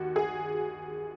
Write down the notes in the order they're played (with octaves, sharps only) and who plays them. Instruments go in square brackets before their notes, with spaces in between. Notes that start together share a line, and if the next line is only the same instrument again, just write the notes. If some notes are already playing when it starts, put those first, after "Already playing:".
Already playing: [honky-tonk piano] D#2 F#4
G#4